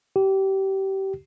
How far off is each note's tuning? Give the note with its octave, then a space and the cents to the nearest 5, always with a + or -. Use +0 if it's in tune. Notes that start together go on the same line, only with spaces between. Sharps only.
G4 -25